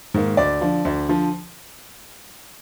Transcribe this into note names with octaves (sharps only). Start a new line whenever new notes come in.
G#2 D#3 A#3
D2 D5
D3 F3
D2
D3 F3